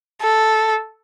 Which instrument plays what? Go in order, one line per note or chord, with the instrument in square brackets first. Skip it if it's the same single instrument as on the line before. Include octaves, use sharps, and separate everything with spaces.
[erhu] A4